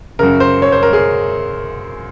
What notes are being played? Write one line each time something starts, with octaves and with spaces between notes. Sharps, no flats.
F#2 C#3 A#4
C5
C#5
C5
A#4
G#4